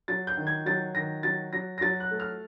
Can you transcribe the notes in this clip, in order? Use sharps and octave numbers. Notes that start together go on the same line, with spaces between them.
F#3 A6
G6
D#3
G#6
F#3 A6
D#3 A#6
F#3 A6
F#3 A#6
A#6
F#3 A6
F#6
A3
F6